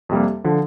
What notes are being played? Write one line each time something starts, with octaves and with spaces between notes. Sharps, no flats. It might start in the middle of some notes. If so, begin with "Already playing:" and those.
F2 C3 G3 A#3
D3 F3